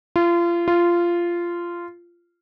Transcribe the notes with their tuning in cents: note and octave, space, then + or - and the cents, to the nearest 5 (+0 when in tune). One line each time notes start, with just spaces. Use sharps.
F4 -30
F4 -15